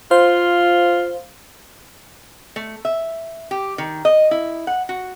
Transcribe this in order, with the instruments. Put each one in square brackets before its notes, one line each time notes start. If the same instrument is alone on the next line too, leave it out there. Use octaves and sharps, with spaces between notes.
[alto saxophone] F4 [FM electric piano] C5 F5
[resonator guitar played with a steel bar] A3
E5
G4
D#3
D#5
E4
F#5
F#4